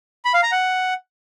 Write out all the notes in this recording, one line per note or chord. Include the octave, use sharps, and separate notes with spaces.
B5
F5
A#5
F#5